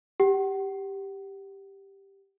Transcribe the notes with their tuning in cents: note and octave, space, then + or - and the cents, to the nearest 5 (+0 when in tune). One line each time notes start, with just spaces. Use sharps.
G4 +0 F#5 +35